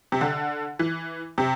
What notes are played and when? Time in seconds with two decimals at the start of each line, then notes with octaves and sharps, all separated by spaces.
0.12 C3
0.21 D3
0.79 E3
1.38 C3